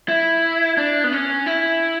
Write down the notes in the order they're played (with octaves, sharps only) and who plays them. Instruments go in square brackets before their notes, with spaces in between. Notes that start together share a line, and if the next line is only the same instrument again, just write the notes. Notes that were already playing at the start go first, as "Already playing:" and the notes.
[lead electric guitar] E4
D4
B3
C#4
E4